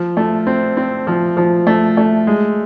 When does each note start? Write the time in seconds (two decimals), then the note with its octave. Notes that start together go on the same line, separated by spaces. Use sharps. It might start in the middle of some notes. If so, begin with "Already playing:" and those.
Already playing: F3
0.17 A3
0.47 C4
0.77 C4
1.07 F3
1.37 F3
1.67 A3
1.97 A3
2.27 G#3